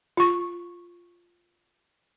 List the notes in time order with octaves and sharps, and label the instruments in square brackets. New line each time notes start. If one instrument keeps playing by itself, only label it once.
[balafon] F4 C#6